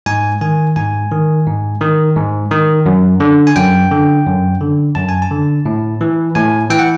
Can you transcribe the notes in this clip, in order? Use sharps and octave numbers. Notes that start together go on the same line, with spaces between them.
G#2 G#5
D#3 G#5
G#2 G#5
D#3
G#2
D#3
G#2
D#3
F#2
D3
G#5
F#2 G5
D3
F#2
D3
F#2 A5
G#5
A5
D3
A2
E3
A2 G#5
E3 G5
F#5